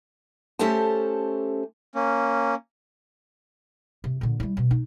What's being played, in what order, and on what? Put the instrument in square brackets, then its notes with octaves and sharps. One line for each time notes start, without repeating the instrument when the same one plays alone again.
[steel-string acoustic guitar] A3 C#4 G4 A4 C5 A5
[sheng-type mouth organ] A#3 C#4
[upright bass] C3
A#2 D3
G3 E4
B2
D#4